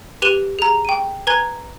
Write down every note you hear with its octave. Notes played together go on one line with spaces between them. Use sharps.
G4 B4 D#7 F7 G7
G#4 A#5
G5 D#7
B4 G#5 A#5 G#6 G7